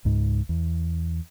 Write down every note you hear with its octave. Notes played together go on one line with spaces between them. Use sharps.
C#2 G#2
E2